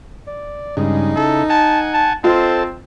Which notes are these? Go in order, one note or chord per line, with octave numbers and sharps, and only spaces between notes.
D5
G2 C#3 G#3 D#4
C#3 E4 A4
F#5 G#5 A5
A5
C4 F4 A4 C5 D#5 A5